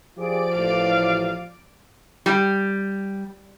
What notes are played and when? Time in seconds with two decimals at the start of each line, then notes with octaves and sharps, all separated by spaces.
0.17 F3 F4 G4 G#4 D5 D7
0.56 A1 F5
2.26 G3